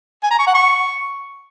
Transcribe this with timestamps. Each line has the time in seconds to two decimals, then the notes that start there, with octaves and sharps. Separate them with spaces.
0.23 G#5
0.31 A#5
0.39 C#6
0.47 F#5
0.55 C#6